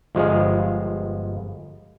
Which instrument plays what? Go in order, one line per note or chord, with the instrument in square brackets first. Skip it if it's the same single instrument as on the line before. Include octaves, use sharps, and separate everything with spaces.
[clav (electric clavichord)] G1 F3 G#3 G#4 F5